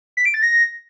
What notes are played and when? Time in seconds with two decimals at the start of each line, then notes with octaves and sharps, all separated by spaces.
0.17 B6
0.25 D7
0.34 A6
0.43 A#6